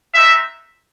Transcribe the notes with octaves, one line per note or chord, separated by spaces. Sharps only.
G#3 C4 D#4 E5